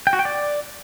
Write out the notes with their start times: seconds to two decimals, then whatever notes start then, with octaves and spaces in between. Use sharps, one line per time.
0.07 G5
0.13 F#4
0.19 G5
0.25 D5